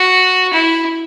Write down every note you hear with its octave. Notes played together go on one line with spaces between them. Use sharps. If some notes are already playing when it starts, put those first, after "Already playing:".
Already playing: F#4
E4